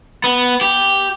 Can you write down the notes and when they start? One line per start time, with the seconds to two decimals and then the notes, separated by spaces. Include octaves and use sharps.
0.24 B3
0.61 G4